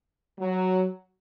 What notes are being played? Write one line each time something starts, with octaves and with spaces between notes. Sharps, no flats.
F#3